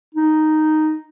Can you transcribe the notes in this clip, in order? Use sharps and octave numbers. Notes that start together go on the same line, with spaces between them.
D#4